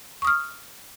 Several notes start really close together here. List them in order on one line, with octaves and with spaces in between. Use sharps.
C#6 D#6 F6